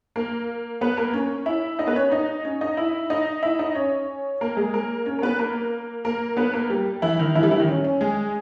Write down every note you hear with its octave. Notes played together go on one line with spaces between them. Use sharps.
A#3 A#4
B3 B4
A#3 A#4
C#4 C#5
E4 E5
D#4 D#5
B3 B4
C#4 C#5
D#4 D#5
C#4 C#5
D#4 D#5
E4 E5
D#4 D#5
E4 E5
D#4 D#5
C#4 C#5
A#3 A#4
G#3 G#4
A#3 A#4
C#4 C#5
A#4
B3 B4
A#3 A#4
A#3 A#4
B3 B4
A#3 A#4
G3 G4
E3 E4
D#3 D#4
E3 E4
G3 G4
E3 E4
D#3 D#4
C#4
C#4
G#3 G#4